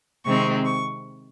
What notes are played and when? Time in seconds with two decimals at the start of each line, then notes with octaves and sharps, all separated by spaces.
0.25 C3 D#3 G#3 C4 C#6
0.65 C#6